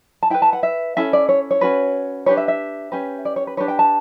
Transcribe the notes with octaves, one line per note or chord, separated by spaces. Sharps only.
A5
E4 B4 G5
A5
F#5
E5
C#4 E4 A4 E5
D5
C#5
C#5
C#4 F#4 B4
D4 G4 B4 C#5
E5
E5
C#4 G4 B4
D5
C#5
B4
D4 G4 B4 C#5
G5
A5